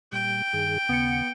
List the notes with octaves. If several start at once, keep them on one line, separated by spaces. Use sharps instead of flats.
A#2 G3 G5
G2 D#3 G#4
D#2 C#3 B3 C#7